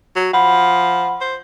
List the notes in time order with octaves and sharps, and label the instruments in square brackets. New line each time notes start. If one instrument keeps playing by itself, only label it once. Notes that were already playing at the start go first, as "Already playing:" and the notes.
[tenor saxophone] F#3
[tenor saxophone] F3 [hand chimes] F#5 B5
[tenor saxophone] C5